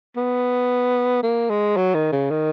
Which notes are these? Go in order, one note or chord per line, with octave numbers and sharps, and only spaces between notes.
B3
A#3
G#3
F#3
D#3
C#3
D#3